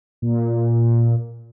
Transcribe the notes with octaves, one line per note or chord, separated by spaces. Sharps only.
A#2